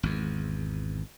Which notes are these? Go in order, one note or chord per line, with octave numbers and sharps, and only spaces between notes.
G#1 E2